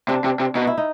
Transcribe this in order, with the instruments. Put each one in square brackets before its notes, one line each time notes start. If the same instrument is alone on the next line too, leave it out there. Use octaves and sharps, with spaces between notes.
[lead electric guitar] C3 [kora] D4
[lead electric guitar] C3
C3
[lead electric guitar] B2 [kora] D#4
[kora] E4
D#4